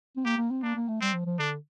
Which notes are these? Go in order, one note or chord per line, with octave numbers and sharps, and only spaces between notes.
C4
A#3 G4
A#3
C4
A#3 D4
A#3
A3
G3 C4
F3
F3
D3 D4